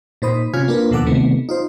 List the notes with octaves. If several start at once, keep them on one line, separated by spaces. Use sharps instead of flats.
A#2 D#4 C5 B5 D#6
C3 C#4 F4 G#5 F6 G#6
A#3 D4 F4 A#4 B4
D#2 B2 F3 A4 F#5 D6
C3 D#3 A3 B3
D#4 F4 C5